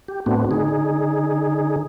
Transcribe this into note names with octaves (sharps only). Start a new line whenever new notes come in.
G4
A2 A3 B3 C4 D4 F#4
D3 D#4 G#4